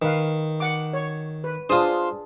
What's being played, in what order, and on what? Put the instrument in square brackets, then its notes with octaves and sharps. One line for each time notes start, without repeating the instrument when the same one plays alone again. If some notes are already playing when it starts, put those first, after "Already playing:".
[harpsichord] D#3 [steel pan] B4 F5
[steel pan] F#5 D6
C#5
B4
[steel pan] D4 G#4 D#6 [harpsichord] F4 C5